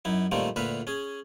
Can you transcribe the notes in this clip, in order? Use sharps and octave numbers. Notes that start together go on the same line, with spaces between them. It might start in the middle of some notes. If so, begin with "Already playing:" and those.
F#2 D#4 E4
A#2 D#3 G3 A3 A#3 C4
D2 A#2 B4 E5 F5
C#4 G#4